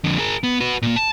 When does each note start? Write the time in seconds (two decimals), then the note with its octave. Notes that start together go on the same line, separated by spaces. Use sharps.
0.04 F2 D3
0.19 G#4 A#4
0.43 B3
0.60 F#4 B4
0.82 A#2 A#3
0.96 A5